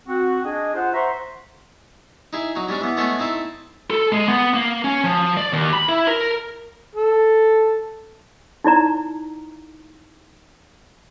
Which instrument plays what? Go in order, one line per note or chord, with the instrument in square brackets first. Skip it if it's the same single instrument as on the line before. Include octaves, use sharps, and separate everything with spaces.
[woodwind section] C4 F#4
D4 G#4 D#5
F4 C5 F#5
C5 E5 F#5 A#5 C6 C#6
[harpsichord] D#4 E4 G#4
F#3 D#4
G3 G#3 C#4 D4
E3 B3
G#3 A3 B3 C#4 G#4 A4
C4 D#4 E4 A4
[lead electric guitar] A4
G#3
B3
A#3
C#4
F3
D5
D#2
B5
E4
A#4
[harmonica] A4
[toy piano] D#4 E4 D5 A#5